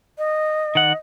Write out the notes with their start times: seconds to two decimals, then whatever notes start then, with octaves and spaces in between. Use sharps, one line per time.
0.18 D#5
0.75 D#3 F#5